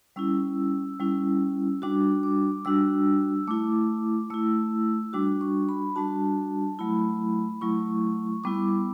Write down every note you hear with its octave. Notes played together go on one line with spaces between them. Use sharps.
G3 C#4 E4 E6
G3 C#4 E4
G3 D4 F#4 D6
D6
G3 D4 F#4 E6
A3 E4 D6
A3 E4 E6
G3 D4 F#4 D6
C#6
B5
G3 D4 F#4 A5
F#3 A3 E4 B5
F#3 A3 E4 C#6
G3 B3 E4 D6